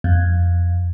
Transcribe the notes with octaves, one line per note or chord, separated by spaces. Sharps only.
F2